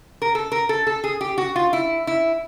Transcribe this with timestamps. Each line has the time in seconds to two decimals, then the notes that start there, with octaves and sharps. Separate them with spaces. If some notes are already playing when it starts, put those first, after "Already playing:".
0.22 A#4
0.35 A4
0.52 A#4
0.69 A4
0.87 A4
1.04 G#4
1.21 G4
1.38 F#4
1.56 F4
1.73 E4
2.07 E4